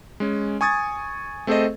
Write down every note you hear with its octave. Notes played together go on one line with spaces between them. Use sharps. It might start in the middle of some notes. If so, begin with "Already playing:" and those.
G#3 C#4
G#5 C#6 D#6 G#6 A6
A3 C4 G#4 A4 C5 D#5